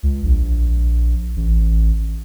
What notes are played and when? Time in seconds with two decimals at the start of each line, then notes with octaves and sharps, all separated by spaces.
0.03 C#2
0.24 A#1
1.36 A1